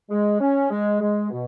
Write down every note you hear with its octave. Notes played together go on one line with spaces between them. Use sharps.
G#3
C#4
G#3
G#3
B2